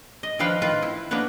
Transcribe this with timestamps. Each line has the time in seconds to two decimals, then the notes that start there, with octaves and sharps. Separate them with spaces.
0.23 D#5
0.39 D#3 F3 D4 B4 F5 G5
0.62 D#3 F4 B4
0.82 E4
1.11 A#3 B3 D4 B4 C#5